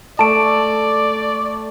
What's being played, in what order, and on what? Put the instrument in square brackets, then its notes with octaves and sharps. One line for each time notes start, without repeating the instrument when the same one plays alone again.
[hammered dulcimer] A3 [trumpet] D5 [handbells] A5 D7